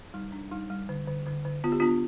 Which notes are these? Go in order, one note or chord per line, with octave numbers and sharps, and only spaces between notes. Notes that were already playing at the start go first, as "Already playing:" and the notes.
G3 D#4
D4
G3 D#4
G3
D3
D3
D3
D3
B3 F4
G4
B3 D4 F4